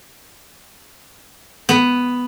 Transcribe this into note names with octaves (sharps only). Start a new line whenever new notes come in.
B3